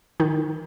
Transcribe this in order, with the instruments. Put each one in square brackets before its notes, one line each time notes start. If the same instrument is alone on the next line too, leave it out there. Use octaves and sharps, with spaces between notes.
[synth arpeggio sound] D#3 D#4